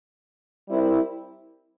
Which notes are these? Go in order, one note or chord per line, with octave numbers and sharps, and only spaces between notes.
G3 C4 E4 A#4